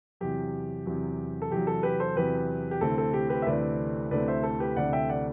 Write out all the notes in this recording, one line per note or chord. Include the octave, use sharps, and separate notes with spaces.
E2 C3 F#3 G4
E2 C3 F#3
A4
E2 C3 F#3 G4
A4
G4 B4
A4 C5
E2 C3 F#3 G4 B4
G4
D2 C3 E3 A3 C4 A4
A4
G4
G4 B4
E5
D2 C3 E3 A3 C4 B4 D5
D2 C3 E3 A3 C4 B4 D5
C5 E5
A4
G4 B4
D2 C3 E3 A3 C4 D5 F#5
E5 G5
D5 F#5